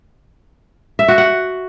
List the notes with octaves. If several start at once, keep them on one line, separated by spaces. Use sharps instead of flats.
E5
F#4
F#5